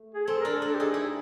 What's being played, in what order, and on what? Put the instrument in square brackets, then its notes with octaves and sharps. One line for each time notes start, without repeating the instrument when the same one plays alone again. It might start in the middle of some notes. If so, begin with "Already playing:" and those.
Already playing: [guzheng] A3
[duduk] G#4
[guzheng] C4 [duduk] A4
[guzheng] D4 [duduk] A#4
[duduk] A4
[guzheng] D4
[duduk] A4
G4
[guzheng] D#4 [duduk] G#4
[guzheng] E4